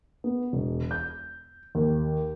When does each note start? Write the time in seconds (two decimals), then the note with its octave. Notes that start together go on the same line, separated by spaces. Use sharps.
0.24 B3
0.53 E1
0.91 G6
1.75 D#2